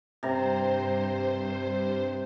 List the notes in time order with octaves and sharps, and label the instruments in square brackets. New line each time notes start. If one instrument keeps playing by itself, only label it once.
[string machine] G2 C5 [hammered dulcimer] C3 A#5